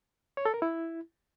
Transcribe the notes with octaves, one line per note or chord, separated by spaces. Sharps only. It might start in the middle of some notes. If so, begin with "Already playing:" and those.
C#5
A4
A#4
E4